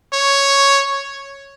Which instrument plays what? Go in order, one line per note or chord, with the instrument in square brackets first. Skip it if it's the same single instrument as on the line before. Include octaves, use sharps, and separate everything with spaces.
[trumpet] C#5